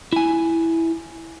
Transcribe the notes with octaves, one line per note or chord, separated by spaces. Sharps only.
E4 G#5